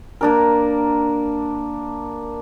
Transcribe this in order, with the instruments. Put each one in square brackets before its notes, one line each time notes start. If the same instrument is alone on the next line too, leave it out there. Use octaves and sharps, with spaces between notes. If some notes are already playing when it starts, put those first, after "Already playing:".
[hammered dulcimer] A#3 D4 A#4